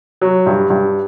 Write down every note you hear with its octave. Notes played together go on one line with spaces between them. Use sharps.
F#3
G2
G2